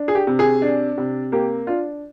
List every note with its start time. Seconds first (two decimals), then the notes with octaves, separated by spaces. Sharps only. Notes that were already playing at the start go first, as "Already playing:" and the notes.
Already playing: D4
0.08 G#4
0.15 G4
0.27 C3
0.39 G#4
0.62 D4
0.98 C3
1.32 A#3 G4
1.67 D4 F4